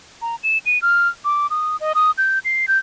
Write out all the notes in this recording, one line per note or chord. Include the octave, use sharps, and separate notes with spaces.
A#5
E7
D#7
F6
D6
D#6
D#5
D#6
G6
C7
G6